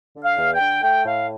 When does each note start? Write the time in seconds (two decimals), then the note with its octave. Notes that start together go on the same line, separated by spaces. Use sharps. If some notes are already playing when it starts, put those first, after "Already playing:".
0.16 D3
0.23 F5
0.38 E2
0.53 G5
0.60 D3
0.83 A3 G5
1.05 A2 F5